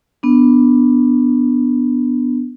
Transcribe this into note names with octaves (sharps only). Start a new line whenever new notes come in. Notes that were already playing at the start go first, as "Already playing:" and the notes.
B3 D4